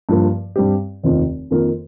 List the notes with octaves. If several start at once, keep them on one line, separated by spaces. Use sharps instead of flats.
G2 F3 A#3
G2 G3 C4 G4
F1 D#2 D#3 C4 F4
F2 D#3 A#3 F4 A#4